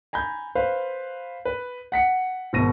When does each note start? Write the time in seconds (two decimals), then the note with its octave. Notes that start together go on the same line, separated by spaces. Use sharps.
0.13 G#5 A#5 B5 G6
0.55 B4 C5 F5
1.45 B4
1.92 F#5 B6 C#7
2.53 G#1 B2 A#6 D#7